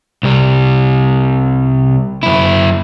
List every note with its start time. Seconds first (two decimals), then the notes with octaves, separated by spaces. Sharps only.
0.23 C2 G3
2.23 F#2 E4